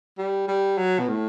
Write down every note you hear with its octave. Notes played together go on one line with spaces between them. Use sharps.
G3
G3
F#3
B2
A2